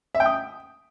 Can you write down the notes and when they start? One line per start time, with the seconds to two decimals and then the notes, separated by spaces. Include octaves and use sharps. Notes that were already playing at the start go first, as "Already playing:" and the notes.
0.15 E5
0.20 G5
0.26 D#6